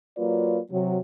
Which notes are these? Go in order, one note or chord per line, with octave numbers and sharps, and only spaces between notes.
F#3 A#3 F4 B4 D5
C3 F#3